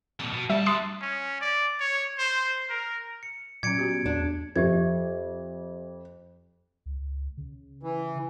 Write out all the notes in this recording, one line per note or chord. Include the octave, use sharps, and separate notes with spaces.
F2 A#2 A5
B2
D2 G3 E5 A5
E5 C6 D#6 F#6
C#4
D5
C#5
C5
A#4
C#7
A#2 F#3 C#4 G#6 C#7 D7
B3 F#4 G4
E2 D4
F2 G4 E5 G#6
C#2
C#3
E3